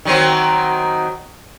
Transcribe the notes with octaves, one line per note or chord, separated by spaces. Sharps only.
D#3 F#3 C4